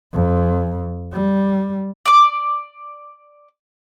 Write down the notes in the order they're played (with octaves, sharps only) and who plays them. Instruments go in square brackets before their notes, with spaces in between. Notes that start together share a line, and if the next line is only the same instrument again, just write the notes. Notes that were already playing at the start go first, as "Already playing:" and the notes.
[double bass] F2
G3
[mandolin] D5 D6